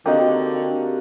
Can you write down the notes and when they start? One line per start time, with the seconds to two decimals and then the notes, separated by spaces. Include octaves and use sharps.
0.06 D3 A#3 C4 D#4 F#4 G4